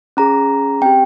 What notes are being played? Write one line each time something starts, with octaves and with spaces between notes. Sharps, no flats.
C#4 G#4 A#5
C4 G4 G5